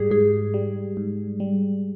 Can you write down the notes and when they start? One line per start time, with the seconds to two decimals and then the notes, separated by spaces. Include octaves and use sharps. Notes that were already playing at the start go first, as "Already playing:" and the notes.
Already playing: G#2 G3 G4 G#4
0.10 G#2 G#4
0.54 G3
0.97 G#2
1.40 G3